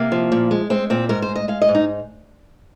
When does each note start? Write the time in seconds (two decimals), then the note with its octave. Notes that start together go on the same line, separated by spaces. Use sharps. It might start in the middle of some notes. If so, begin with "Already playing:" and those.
Already playing: C3 A#3
0.12 F3
0.32 A#2
0.51 G#3
0.70 G#3 C4
0.90 A#2 C4
1.09 G#2 A#4
1.22 C5
1.29 G#3
1.36 D#5
1.48 G#3 F5
1.62 D#5
1.69 G#2
1.75 D#4